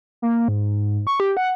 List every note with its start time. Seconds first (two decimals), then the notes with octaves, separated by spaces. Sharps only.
0.22 A#3
0.48 G#2
1.07 C#6
1.20 G4
1.37 F#5